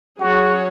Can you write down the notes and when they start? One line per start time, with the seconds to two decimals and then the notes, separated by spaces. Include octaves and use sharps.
0.19 F#3 C#4 F#4 G#4 C#5